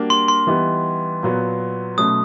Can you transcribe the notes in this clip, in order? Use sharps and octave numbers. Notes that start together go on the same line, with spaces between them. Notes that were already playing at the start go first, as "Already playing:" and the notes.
Already playing: G3 A#3 D4 F#4 A#4
C6
C6
E3 G3 B3 D#4
A#2 F#3 B3
B2 F#3 A3 C#4 D#6